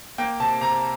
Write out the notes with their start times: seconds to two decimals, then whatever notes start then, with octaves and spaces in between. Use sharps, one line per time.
0.18 A#3 G5
0.40 C3 A5
0.61 C3 A#5